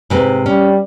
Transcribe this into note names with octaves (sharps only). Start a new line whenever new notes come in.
G#2 C3 B4
G3 C#4